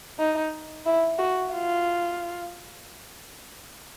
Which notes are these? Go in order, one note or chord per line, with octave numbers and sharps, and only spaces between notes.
D#4
E4
F#4
F4